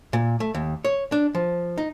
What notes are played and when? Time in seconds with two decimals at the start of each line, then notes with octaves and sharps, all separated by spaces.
0.13 A#2
0.40 A3
0.55 D#2
0.85 C#5
1.12 D4
1.35 F3
1.78 D#4